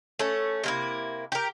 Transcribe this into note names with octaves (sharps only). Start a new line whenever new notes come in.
A3 C#4
C3 A#3 E4
G4 A#4